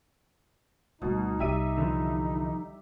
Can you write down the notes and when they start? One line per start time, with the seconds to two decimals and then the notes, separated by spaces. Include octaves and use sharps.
1.02 D2 B2 G3 D#4
1.39 C2 G3 B3 E5 D#7
1.78 D3 E3 F3